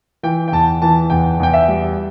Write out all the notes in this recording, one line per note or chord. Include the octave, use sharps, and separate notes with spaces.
E3 G5
G5
E2 A5
E3 A5
E2 G5
E2 G5
E5
G3